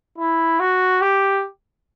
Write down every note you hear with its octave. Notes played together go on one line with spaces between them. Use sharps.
E4
F#4
G4